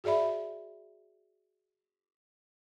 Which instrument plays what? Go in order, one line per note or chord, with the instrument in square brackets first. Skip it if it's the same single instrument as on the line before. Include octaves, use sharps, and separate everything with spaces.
[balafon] F#4 G#4 D5 E5 B5